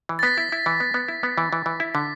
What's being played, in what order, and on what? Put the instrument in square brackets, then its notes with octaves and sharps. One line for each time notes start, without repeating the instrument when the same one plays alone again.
[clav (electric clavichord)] E3
[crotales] A6
[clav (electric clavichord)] B3 [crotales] B6
[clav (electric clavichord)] E4
E4
E3
B3
B3
E4
B3
E3
E3
E3
E4
[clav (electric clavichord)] D3 [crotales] B6